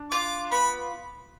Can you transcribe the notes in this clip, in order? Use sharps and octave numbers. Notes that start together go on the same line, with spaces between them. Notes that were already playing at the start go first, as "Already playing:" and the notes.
Already playing: D4
F4 D6
B3 B5